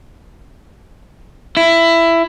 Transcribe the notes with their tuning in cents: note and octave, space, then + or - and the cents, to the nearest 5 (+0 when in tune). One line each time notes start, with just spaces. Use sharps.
E4 +15